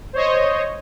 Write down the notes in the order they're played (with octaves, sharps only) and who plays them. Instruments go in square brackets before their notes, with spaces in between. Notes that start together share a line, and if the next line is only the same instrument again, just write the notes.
[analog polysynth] C5 C#5 D#5